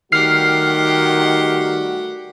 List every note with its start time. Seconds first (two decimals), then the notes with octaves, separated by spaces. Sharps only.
0.12 D#3 G3 A3 F#4 G4 F#5 F6 C7